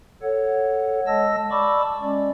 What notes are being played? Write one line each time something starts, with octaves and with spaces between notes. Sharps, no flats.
A4 C#5 F#5
G#3 D#5 A5 E6 A#6
D5 A5 B5 C#6 D6 E6
G#3 C#4 D5